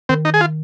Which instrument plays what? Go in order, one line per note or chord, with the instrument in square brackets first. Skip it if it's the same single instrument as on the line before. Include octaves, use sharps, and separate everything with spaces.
[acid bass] D#3 [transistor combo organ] C4
[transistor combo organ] D#4
G#4
F4